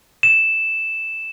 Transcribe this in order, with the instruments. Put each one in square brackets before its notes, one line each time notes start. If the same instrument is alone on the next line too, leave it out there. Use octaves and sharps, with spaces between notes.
[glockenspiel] E7